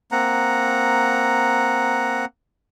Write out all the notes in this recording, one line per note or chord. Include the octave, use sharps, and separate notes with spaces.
A#3 C4 F#5 A#5